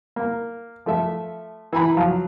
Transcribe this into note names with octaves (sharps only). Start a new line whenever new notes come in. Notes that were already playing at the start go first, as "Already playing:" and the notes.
A#3
F3 A3 E5
E3 E4 G#5 A#5 B5
F3 F#3 F5